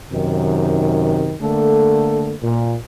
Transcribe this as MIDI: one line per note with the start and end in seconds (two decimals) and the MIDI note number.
0.12 1.35 42
0.12 1.35 48
0.12 1.35 51
1.41 2.34 50
1.41 2.34 57
1.41 2.34 58
1.41 2.34 69
2.42 2.76 46